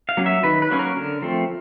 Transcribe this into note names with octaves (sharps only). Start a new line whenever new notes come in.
F5
F#3 A#3 C#4
E5
D#3 B4
B4
F#3 A#3 C#4
A#4
D3
F3 A3 C4